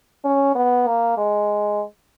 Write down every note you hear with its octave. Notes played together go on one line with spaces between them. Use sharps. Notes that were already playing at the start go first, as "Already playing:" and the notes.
C#4
B3
A#3
G#3